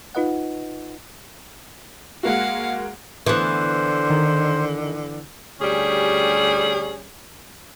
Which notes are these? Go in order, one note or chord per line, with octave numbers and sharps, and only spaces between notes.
D#4 F4 B4 D#5 F#5
G#3 A#3 F#4 F5 F#5
D3 E3 B3 C5
D#3
D2 G3 C#4 G4 G#4